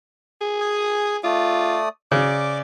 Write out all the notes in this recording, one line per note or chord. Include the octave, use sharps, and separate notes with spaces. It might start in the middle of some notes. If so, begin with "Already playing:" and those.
G#4
G#5 D#6
A3 F4 D5 D#6
C#3 D5 D6